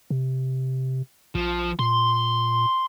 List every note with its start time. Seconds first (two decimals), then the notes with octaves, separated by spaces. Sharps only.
0.10 C3
1.35 A#1 F3
1.79 A#2 C6